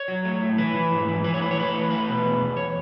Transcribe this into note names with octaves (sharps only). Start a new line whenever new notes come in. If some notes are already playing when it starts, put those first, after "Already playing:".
Already playing: C#5
F#3
A3
A2
E3 B4
E3
G#2
E3
E3 B4
C#5
A3 B4
C#5
E3 B4
A3
A3 B4
B2
E2
E2
C#5